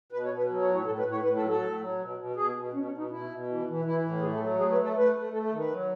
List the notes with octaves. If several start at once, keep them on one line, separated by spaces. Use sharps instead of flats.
B2 B4
C#5
B2
B4
F#3
C#5
A2
C#5
A2 A4
B4
A2
C#5
A2 B4
A4
F#3
A4
A2
F#3
B2
B2
B2 G#4
B2
B2 C#4
C#4
B2
D#4
B2 E4
B2
E3
E3
E3 E4
A2
A3 G#4
A4
F#3
A3 G#4
B4
A3
A4
A3 B4
A3
A3 A4
A4
D#3
B4
F#3